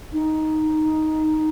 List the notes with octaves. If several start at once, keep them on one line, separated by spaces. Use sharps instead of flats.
D#4